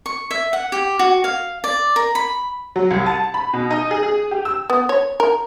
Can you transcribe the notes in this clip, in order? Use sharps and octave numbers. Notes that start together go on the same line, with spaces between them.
C#6
E5
F#5
G4
F#4
F5
D5
A#4
B5
F#3
C2
A5
B5
B2
D#4
G#4
G#4
G4
E6
B3
C#5
A#4